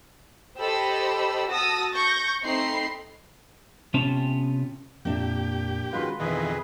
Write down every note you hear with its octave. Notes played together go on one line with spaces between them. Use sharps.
G4 A4 C5 D#5 B5 E6
F#4 A5 D#6 E6 A#6
C#6 G6 A#6
A3 C4 D#4 B5 C6 C7
C3 B3 C#4 F4 C#5 A5
F2 A#2 A#3 D4 G4 E5
D#3 G#3 C#4 F4 F#4 B4 F5 C6
F2 B2 D#3 E3 G#4 B4